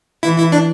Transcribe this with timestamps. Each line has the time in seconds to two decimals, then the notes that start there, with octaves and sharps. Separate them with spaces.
0.23 E3 E4
0.38 E4
0.52 D4